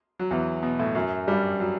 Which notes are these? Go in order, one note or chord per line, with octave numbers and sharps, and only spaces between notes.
F#3
E2 E3
B2
A2
F#2 F#3
G2 G3
F#3